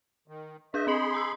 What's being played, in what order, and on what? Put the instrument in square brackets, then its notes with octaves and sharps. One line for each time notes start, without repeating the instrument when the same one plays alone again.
[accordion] D#3
[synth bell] D4 G#4 G6 [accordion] D#5 E5
[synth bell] C4 D#5 F#7 [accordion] G#4 B5 C6
[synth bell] A#5 E6